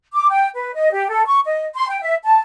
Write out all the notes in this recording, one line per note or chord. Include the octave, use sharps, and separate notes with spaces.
D6
G5
B4
D#5
G4
A4
C#6
D#5
C6
G5
E5
A5